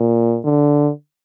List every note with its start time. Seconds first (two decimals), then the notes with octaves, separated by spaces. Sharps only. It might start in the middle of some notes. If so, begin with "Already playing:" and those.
Already playing: A#2
0.44 D3